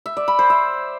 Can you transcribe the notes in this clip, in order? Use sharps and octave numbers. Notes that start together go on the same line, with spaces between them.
E5
D5
B5
C5
E5